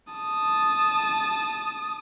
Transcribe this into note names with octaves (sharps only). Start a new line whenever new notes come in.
A5 D#6